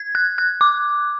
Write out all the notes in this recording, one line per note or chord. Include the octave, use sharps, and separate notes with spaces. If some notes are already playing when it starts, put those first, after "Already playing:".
Already playing: G#6
F#6
F#6
D6